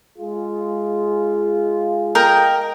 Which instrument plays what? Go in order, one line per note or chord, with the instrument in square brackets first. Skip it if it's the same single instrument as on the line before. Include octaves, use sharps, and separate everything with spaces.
[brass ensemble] G#3 F4 G#4
[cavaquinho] A#4 D#5 G5